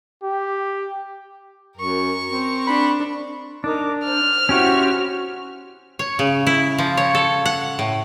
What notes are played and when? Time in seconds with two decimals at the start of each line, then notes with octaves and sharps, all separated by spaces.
0.23 G4
1.77 F#2 A#4 C#6
2.29 C4
2.67 D4 B5
3.64 D4 D#4 A#4 D6
4.05 C5 F6
4.49 C#4 E4 F#4 G4 C5 C#6
5.99 C#5
6.19 C#3
6.47 E4
6.78 F3
6.97 C#5
7.15 A4
7.45 F#5
7.79 A2